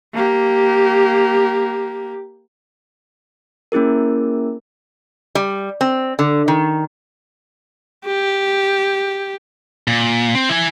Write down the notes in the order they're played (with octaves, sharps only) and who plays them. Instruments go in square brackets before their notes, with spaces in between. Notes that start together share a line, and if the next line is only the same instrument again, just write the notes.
[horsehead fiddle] A#3 G4
[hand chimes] A#3 C#4 E4 G#4 A#4
[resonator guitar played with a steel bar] G3
C4
D3
D#3
[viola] G4
[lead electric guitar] A#2
C4
E4 G#5